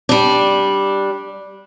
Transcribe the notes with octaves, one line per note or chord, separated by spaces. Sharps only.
G3 D4